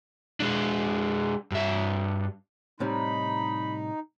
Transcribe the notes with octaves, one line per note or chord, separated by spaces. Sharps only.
G#3 D4
G2 E5
A2 C3 G3 D#4 B5